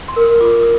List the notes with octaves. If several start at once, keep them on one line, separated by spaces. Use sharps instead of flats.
C6
A#4
D#6
F4 D6
D#6